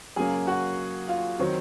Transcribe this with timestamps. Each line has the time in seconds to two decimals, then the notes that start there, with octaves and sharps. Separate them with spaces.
0.16 F#2 C#3 F#3 A#3 G#4 G#5
0.47 F#4 F#5
1.08 F4 F5
1.39 D#3 F#3 C4